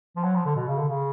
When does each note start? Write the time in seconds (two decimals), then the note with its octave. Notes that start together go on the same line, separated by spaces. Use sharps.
0.16 F3
0.24 F#3
0.36 F3
0.46 D3
0.56 B2
0.68 C#3
0.78 D3
0.88 C#3